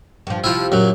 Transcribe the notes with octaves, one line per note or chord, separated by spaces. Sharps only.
G2 F3
C3 F3 E4 F4
F#2 A#2 F#3